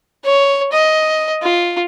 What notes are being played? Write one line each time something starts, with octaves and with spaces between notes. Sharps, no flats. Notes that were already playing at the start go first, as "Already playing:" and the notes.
C#5
D#5
F4